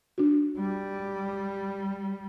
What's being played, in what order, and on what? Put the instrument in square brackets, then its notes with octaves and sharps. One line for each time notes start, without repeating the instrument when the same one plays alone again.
[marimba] D4 F#4
[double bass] G3